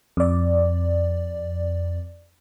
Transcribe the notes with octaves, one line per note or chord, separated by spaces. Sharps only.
F2 D5